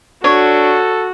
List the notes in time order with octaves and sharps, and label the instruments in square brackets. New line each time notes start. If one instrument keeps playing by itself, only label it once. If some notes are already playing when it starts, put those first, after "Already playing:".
[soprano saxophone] D4 [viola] F#4 [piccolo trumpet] A4 [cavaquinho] C#5